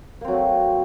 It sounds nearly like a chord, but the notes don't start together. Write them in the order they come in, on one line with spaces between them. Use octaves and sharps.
A#3 C4 F#3 A3